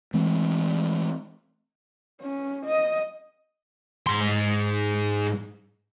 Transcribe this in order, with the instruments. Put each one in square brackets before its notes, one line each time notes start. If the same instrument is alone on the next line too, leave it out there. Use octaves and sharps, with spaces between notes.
[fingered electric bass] E3 G#3 A3 C4
[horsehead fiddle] C#4
D#5
[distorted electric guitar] G#2 C6